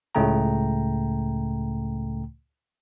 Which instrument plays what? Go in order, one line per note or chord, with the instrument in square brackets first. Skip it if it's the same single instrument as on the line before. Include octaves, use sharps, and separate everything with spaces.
[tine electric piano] C#2 A2 C#3 A3 G5 A#5